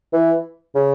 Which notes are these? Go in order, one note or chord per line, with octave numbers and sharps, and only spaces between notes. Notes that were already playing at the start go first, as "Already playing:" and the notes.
E3
C#3